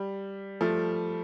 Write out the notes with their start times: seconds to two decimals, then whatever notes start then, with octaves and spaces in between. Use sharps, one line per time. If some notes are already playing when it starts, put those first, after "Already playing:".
Already playing: G3
0.61 F3 A3